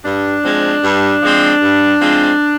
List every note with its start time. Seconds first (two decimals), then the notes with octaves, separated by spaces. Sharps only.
0.04 G2 D4
0.43 F3 G#3 C4
0.83 G2
1.22 F3 G#3 C4
1.61 G2
2.00 F3 G#3 C4